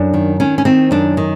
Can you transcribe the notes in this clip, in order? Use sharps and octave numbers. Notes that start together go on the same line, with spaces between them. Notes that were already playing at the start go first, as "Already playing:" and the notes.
Already playing: F#2 D4
D#3
D#3 C#4
C#4
D#3 C4
F#2 D4
D#3